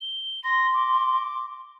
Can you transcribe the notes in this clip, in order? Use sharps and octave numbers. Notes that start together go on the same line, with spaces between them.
G7
C6 A#6
D6